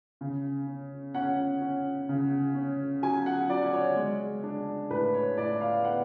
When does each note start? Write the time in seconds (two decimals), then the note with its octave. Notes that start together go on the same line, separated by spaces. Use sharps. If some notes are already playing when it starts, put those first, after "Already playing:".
0.21 C#3
0.67 C#4
1.14 C#4 F#5
1.61 C#4
2.09 C#3
2.55 C#4
3.03 F#3 G#5
3.26 F#5
3.50 F#3 D5
3.73 C#5
3.96 G#3
4.43 D4
4.90 A2 B4
5.14 C#5
5.37 A2 D5
5.61 F5
5.84 B3 F#5